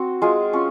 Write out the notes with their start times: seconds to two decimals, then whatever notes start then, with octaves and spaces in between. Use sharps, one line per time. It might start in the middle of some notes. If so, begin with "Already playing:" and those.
Already playing: C4 F#4
0.22 G#3 F4 G#4
0.53 C#4 F4